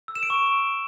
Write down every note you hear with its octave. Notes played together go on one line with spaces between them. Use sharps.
E6
E7
D7
C#6